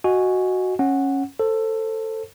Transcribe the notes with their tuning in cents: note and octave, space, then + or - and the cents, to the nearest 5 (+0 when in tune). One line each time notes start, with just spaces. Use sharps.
F#4 +0 D#5 +0 G#5 +0
C#4 -15 F#5 +0
A4 +15 C5 +15